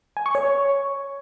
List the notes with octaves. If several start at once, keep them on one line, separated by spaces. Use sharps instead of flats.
G#5
C#6
C#5